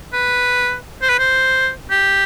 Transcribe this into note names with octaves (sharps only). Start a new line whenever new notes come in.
B4
C5
B4
C5
G4